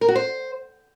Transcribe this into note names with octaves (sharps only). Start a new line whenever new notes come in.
A#4
F#4
C5